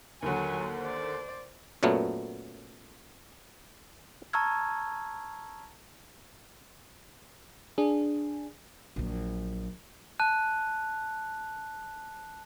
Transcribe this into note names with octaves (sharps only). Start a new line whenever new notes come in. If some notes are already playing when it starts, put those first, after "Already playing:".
D#2 D3 F#3 G#5
C5 D5
F#2 A#2 F#3 A3 B3
A5 A#5 C#6 E6 F6 G#6
D4 G#4
A#1 F#3
A5 F#6